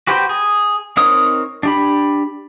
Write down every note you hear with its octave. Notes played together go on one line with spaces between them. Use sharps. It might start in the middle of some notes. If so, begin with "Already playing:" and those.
F#4 G4 B4 C5 G5
G#4
C4 D#4 A#4 C#5 D#6
D4 G4 B5